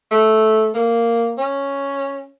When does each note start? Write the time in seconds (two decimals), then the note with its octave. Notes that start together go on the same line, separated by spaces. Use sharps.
0.11 A3
0.75 A#3
1.38 C#4